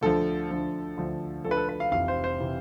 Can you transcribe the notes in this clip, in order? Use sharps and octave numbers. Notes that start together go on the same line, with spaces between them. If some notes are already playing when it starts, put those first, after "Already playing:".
D2 D3 F3 A4
D2 D3 F3
D2 D3 F3
D2 D3 F3 A4
B4
A4
B4
F5
F1 F2 C3 E3 F5
C5
C5
C3 E3